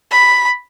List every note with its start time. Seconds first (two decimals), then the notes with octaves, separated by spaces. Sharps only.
0.11 B5